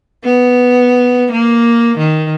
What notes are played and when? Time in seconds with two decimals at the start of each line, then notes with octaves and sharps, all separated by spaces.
0.24 B3
1.32 A#3
1.98 D#3